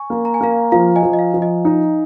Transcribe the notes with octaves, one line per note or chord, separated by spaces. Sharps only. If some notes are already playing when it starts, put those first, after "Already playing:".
Already playing: G#5 C#6
A#3
A#5
G#5
A#3 F5 A#5
F3 F5 A#5
D#5 G#5
F3
D#5
F5
F3
D#5
D#4